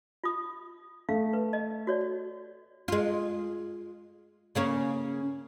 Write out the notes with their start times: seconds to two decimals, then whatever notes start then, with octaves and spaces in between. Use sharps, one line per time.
0.24 F4 D#6
1.09 A3 F5
1.33 B4
1.53 D#5
1.87 F#4 C#5 D5
2.88 G#3 F4
4.55 C#3 A#3 C#4